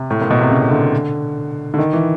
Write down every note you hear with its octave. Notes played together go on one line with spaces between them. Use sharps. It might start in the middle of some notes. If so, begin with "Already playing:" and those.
Already playing: C3
A2
A#2
B2
C3
C#3
D3
D3
D#3
E3